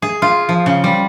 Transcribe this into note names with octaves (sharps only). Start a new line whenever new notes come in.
G#4
F4
F3
C#3
G3